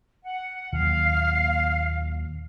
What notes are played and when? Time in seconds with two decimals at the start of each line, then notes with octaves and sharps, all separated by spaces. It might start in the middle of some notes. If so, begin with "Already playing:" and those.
0.24 F#5
0.72 D#2 A#2 F#3 F5